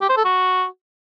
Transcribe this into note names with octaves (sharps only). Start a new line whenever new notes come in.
G4
C5
A4
F#4